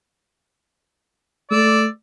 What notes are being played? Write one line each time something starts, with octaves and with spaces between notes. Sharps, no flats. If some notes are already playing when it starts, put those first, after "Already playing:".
A3 D5 E6